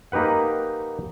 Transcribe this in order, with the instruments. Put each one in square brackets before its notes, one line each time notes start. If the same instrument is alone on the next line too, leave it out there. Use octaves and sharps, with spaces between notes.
[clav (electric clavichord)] A#3 D#4 G4 B4 F#5